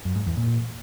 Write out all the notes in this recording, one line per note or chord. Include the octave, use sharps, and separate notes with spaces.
F#2
G#2
E2
A#2